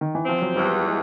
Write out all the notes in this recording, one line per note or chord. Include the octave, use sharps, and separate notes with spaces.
D#3
E3
F3 C4
F#3
E2 G3
G#3